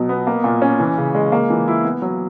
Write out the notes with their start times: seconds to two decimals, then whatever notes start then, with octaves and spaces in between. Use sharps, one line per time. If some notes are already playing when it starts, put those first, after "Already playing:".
Already playing: B2 F#3
0.09 B3
0.27 A#3
0.44 A#2
0.62 C#4
0.80 E3
0.98 C#3
1.15 G#3
1.32 A#3
1.50 E3
1.68 E4
1.84 B3
2.02 F#3